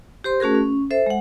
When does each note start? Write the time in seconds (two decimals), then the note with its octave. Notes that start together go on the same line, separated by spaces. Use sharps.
0.24 G4 C5 C6
0.40 A3 C#4 F#4 G#4 A#4
0.55 C#4
0.91 A4 C5 E5
1.06 G#3 F#5